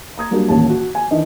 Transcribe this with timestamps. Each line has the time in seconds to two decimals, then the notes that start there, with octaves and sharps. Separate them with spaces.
0.18 A#5 D#6 G#6
0.31 F#3 G3 A#3 D4 F#4 G4
0.48 D#1 A1 D#2 A5
0.70 F#4
0.95 G#5
1.11 D#3 E3 D4 D#5